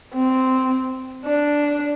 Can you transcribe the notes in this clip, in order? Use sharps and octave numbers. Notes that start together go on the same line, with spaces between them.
C4
D4